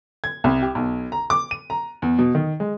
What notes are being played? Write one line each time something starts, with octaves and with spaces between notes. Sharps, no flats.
G#6
C2
G4
B1
A#5
D6
D#7
A#5
E2
B2
D#3
G#3